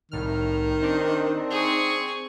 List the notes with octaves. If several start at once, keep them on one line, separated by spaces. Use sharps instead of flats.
C2 A2 D#3 F6
C4 D4 D#4
G#4 C#6